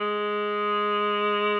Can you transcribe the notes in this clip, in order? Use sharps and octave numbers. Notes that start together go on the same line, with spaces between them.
G#3